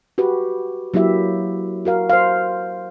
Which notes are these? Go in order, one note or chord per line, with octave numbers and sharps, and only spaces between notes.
F#4 G4 B4
F#3 A#3 E4 G4 E5
F#4 A#4 F5
C5 F5